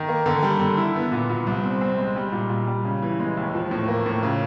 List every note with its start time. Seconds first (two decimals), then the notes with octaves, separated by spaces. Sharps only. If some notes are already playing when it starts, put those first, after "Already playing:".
Already playing: D#3
0.09 A#3
0.26 D3
0.43 G3
0.60 D3
0.77 E4
0.95 B3
1.12 A#2
1.29 A#2
1.47 C2
1.63 C4
1.81 C4
1.98 G#3
2.16 G3
2.32 A#2
2.49 A#2
2.67 G3
2.84 C#3
3.02 E3
3.19 G#3
3.37 D#2
3.54 F3
3.71 A2
3.88 A#3
4.06 A2
4.23 C#3